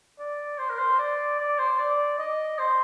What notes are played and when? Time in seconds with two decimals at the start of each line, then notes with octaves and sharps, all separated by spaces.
0.19 D5
0.59 C5
0.70 A#4
0.79 C5
0.99 D5
1.39 D5
1.59 C5
1.78 D5
2.19 D#5
2.59 C5